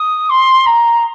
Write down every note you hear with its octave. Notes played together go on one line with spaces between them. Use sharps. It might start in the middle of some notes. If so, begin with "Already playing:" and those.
Already playing: D#6
C6
A#5